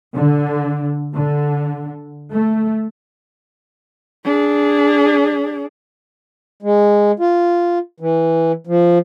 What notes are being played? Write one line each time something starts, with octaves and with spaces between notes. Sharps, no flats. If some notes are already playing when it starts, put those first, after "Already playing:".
D3
D3
A3
D4 G#4
G#3
F4
E3
F3